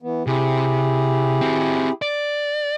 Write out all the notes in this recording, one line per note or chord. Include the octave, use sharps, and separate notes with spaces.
E3 B3
C3 E4 G4 G#4
C4 F#4
D5